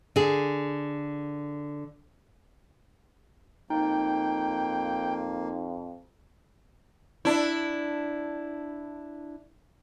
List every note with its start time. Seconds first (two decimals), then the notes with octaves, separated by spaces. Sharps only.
0.16 D3 G#4
3.70 F2 A#3 D#4 G5
7.25 D4 E4